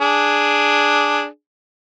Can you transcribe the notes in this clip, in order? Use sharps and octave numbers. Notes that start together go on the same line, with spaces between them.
D4 G#4